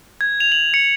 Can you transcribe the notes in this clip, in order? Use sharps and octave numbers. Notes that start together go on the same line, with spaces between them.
G#6
F7
F#7
C#7